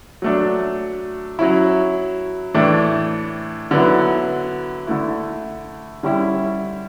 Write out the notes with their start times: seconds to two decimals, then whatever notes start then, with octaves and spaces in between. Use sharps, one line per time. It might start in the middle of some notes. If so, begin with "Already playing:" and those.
0.22 F#3 A3 D4
1.39 F#3 C#4 E4
2.54 A2 E3 A3 D4
3.71 D3 F#3 B3 E4
4.87 D3 A3 E4
6.03 D3 G3 C#4 E4